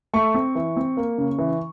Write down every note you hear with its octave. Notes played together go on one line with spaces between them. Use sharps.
A3 C#6
C4
E3
C4
A#3
C#3
E3